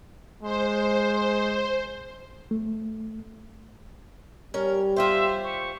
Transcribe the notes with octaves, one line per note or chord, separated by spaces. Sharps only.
G#3 C5
A3
G3 C#4 A#4
F4 G4 C5 E5
C#6